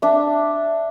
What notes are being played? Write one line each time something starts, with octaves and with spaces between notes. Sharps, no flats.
D4 E5